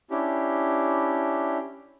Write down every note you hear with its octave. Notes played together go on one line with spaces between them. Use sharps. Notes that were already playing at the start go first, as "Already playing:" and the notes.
C#4 D4 E4 G4